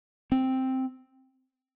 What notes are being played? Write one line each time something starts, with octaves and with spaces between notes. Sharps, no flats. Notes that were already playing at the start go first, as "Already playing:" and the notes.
C4